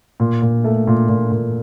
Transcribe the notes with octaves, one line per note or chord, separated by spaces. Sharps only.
A#2
A#2
A3
A#2
A#2
A#2